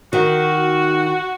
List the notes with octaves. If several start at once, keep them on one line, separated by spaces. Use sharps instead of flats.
D#3 F#4